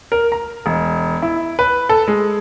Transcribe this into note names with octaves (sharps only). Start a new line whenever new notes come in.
A#4
A#5
E1
E4
B4
A4
G#3